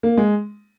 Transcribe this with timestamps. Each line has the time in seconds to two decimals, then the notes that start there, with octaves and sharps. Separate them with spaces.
0.03 A#3
0.17 G#3